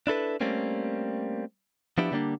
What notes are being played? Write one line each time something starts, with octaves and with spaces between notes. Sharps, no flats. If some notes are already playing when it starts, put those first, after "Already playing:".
D4 E4 A4 B4
G3 A3 A#3 C4 C#4
F3 B3 D4 E4 G4
D3 G3 A#3 C4 D4